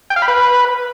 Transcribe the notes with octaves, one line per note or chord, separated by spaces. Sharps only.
G5
F5
B5
B4